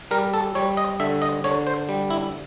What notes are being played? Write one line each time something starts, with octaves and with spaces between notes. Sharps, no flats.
G3 A#4
A4
G3 C#5
D#5
D3 E5
D#5
D3 C#5
C5
G3
E4